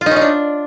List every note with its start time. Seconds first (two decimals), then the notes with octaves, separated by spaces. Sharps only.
0.01 F4
0.06 D#4
0.11 C#4
0.16 D#4
0.21 D4